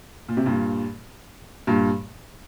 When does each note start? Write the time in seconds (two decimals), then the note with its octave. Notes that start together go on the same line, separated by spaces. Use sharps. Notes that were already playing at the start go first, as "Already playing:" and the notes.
0.28 A#2
0.37 C3
0.46 G2 A#2
1.67 G2 A#2